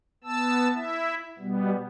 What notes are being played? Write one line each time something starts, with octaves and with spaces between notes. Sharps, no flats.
B3 A5 E6
E4 E5
B2 G3 B3